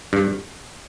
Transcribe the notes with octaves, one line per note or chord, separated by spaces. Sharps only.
G2